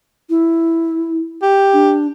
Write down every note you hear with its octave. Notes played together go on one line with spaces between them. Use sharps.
E4
G4
D4